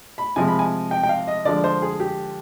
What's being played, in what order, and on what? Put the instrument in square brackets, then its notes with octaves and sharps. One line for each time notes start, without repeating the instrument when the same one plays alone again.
[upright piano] B5
C3 F3 G#3 G#5
B5
G#5
G5
G5
F5
D#5
D3 F3 G#3 D5
C5
G#4
G4